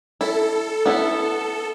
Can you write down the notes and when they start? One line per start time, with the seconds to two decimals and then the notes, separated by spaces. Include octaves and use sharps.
0.21 E4 A4
0.86 B3 E4